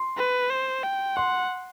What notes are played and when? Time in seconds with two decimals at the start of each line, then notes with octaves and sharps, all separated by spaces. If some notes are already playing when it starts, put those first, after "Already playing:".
Already playing: C6
0.17 B4
0.50 C5
0.83 G5
1.16 F#5 C6